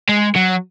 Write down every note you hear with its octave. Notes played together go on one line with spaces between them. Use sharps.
G#3
F#3